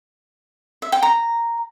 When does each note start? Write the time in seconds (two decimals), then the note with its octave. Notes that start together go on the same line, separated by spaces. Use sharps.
0.82 E5
0.92 G5
1.03 A#5